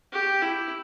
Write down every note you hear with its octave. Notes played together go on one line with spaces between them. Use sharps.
G4
E4